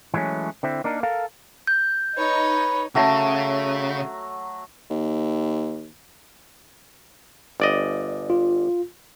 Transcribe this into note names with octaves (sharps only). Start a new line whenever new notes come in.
E3 F#3 G#3 A3 C#4
D3 C4 E4
A#3 D4 D#4 A#4
A4 A#4 F5
G6
D#4 B4 C#5 D#5
C#3 F#3 A3 A#5
D#2
G1 D5 D#5
F4